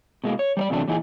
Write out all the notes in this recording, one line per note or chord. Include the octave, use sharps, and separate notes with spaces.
B2 G#3 A#3
C#5
G3 C#5 D5
E2 C3 F#3 A3 D4
A#2 E3 D#4 G#4